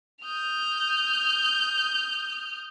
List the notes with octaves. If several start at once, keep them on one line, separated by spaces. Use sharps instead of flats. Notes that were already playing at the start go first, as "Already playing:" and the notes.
D#6 F6 G6